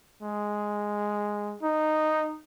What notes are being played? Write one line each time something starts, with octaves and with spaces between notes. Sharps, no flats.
G#3
D#4